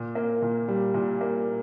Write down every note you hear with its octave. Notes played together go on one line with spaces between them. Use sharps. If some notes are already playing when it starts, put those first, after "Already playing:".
Already playing: A#2
A#3
A#2
G3
A#2
A#3